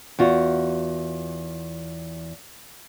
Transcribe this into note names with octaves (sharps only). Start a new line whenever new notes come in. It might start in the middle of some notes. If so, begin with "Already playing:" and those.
E2 F4 F#4